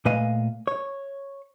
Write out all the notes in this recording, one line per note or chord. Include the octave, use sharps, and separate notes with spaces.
A#2 A3 B4 D#5 F5 G#5
C#5